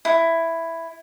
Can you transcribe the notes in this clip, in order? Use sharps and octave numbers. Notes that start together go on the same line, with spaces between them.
E4